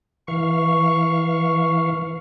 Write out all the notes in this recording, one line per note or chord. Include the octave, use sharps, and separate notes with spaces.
E3 F5 C#6